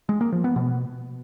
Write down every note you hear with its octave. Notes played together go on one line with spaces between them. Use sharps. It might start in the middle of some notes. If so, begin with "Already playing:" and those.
G#3
A#3
F3
B3
B2